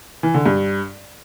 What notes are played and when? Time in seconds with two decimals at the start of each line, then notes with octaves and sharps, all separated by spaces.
0.23 E3
0.34 D3
0.46 G2